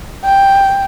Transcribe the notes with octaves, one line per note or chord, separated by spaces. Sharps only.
G5